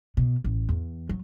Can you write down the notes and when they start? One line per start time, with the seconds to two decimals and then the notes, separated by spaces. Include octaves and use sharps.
0.17 B2
0.44 A1
0.69 E2
1.09 F#3